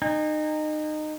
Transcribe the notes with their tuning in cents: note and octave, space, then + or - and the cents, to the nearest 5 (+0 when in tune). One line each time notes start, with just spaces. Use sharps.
D#4 -25 G#5 -45